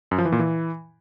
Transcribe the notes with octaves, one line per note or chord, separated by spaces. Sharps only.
F#2
F3
E3
A#2
E3